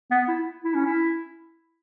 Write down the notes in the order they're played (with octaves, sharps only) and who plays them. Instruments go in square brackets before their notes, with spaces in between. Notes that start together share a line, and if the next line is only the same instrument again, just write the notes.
[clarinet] B3
E4
E4
C#4
E4